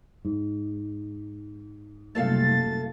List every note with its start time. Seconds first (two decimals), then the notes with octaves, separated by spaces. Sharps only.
0.25 G#2
2.15 F#1 C2 A3 A4 F5 A6